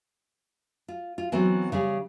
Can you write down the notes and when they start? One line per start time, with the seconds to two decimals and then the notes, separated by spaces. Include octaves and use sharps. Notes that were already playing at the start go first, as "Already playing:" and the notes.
0.88 F4
1.18 F4
1.32 E3 F#3 B3 C4
1.72 C#3 G3 G#4